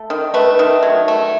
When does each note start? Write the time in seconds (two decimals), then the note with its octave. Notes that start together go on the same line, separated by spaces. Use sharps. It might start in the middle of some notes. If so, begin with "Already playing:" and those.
Already playing: A3
0.10 D#3
0.34 A3 B4
0.59 D#3
0.83 F#3
1.08 A3